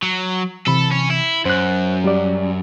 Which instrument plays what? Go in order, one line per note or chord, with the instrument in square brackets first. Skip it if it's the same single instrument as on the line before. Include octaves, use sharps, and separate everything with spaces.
[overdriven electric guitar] F#3
[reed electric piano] C3 E3 B5 [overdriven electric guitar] A4
[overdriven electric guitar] C#4
E4
[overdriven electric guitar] F#2 [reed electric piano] C5 F#6
[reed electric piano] G3 G4 D5